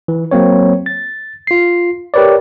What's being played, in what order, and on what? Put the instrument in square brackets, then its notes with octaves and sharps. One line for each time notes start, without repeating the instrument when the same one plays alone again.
[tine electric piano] E3
F#3 A#3 C4 C#5
A6
F4 C7
G4 A#4 B4 C#5 D5